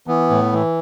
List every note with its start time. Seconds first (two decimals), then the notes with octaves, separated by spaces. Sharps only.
0.07 E3 B3
0.30 A2
0.52 E3